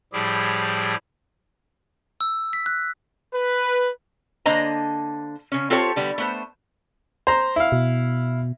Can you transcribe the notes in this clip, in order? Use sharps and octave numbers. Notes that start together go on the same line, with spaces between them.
A2 F3 G3 E4 G4 G#4
E6
B6
F#6
B4
D3 A#3 D4 C5 D#5 A#5
C#3 C#4
C4 F4 G4 A4 C5 C#5
D3 G3 B3
A3 B3 C5
C5 A#5
E4 F5
B2